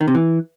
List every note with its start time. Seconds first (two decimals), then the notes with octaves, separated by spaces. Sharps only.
0.01 D#3
0.08 C3
0.15 E3